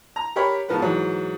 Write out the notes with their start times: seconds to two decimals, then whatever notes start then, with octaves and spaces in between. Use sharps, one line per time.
0.16 A#5
0.36 G4 A#4 C#5 B5
0.69 G#2 F3 B3 A#4 B4
0.82 G#2 E3 F#3